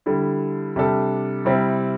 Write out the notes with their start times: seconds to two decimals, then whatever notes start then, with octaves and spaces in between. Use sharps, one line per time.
0.06 D3 G3 E4
0.76 C3 G3 D4 A4
1.45 C3 G3 C4 E4